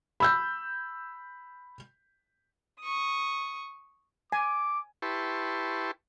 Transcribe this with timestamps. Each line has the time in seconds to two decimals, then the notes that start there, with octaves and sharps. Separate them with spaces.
0.20 B5 E6 G6
2.81 C#6 D#6
4.32 G#5 D6
5.02 E4 G4 B4 A5 C6 C#6